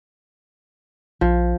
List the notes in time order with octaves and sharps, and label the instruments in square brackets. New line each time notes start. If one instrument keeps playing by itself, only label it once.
[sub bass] A#1 [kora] F3